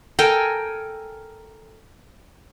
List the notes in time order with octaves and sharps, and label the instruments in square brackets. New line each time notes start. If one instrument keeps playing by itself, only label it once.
[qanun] A4 A#4 G5 G#5